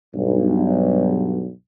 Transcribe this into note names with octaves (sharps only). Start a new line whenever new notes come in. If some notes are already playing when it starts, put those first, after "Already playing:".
B1 G2